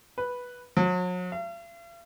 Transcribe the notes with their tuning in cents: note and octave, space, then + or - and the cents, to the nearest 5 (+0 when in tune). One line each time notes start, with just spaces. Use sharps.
B4 -5
F#3 -40
F5 -45